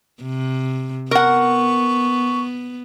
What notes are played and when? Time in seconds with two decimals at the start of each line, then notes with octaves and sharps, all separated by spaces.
0.22 C3
1.11 B3 A#4 F#5 C#6